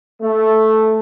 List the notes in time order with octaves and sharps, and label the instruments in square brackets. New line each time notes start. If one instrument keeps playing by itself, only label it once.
[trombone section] A3